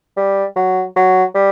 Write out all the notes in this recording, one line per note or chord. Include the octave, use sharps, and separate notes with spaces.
G3
F#3
F#3
G3